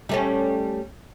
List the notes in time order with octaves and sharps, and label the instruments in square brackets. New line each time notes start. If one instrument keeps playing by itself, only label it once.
[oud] G3 A3 C#4